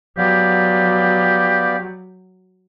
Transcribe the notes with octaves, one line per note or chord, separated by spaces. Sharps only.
F#3 B3 G4 D5 F5